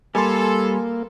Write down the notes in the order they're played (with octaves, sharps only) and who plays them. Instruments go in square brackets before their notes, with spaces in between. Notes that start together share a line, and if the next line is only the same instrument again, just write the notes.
[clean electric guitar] G3 [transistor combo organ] A#3 [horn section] A4 [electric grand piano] G#5 C6